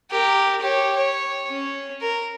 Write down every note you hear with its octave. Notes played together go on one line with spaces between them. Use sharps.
G4 A#4
G4 C#5
C#5
C#4
A#4